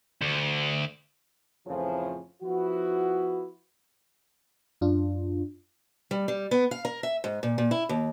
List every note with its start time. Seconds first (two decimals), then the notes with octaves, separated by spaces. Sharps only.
0.22 D2
1.67 F2 A2 C#3 E3 F3
2.42 F3 B3 E4 F#4
4.81 F#2 D4 F4
6.11 G3
6.28 G3
6.51 B3
6.71 F5
6.85 A#4
7.03 E5
7.24 G#2
7.43 A#2
7.58 A#2
7.71 E4
7.89 D#2